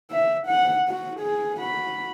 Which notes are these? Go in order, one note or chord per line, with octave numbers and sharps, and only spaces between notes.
E5
F#5
F#4
G#4
F#4 B5